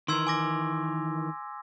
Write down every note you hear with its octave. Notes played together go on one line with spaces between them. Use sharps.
D#3 E3 A#4 C6 E6 G#6
G#5 D6 A#6